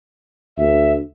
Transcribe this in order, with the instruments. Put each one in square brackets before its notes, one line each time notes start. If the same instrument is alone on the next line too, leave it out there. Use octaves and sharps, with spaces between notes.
[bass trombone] D2 [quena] E5